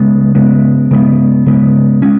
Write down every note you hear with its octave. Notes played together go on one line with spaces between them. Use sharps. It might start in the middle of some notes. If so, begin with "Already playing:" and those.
Already playing: C#3 G#3 B3
C#3 G#3 B3
C#3 G#3 B3
C#3 G#3 B3
G#3 C#4